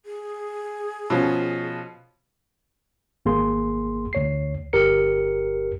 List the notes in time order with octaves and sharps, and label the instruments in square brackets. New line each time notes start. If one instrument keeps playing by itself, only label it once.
[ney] G#4
[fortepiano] B2 F3 C#4
[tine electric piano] G#1 A#3 G#4 C6
D2 C#5 C7
G1 G4 A#4 C#7